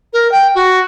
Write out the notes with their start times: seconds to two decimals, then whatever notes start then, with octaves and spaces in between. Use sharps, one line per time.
0.13 A#4
0.32 G5
0.55 F#4